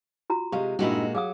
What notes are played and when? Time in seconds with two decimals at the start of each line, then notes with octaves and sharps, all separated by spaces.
0.30 F4 F#4 A#5
0.52 C3 G#3 G4 A#4 F5
0.79 G2 A#2 G#3 D#4 E4 F#4
1.15 F#3 G#4 F5 D#6